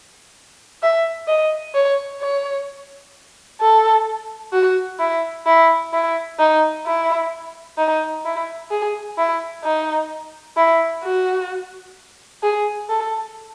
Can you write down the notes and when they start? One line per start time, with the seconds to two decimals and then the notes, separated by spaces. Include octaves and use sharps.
0.83 E5
1.28 D#5
1.75 C#5
2.22 C#5
3.61 A4
4.53 F#4
5.00 E4
5.47 E4
5.93 E4
6.39 D#4
6.86 E4
7.78 D#4
8.26 E4
8.71 G#4
9.18 E4
9.64 D#4
10.57 E4
11.04 F#4
12.43 G#4
12.89 A4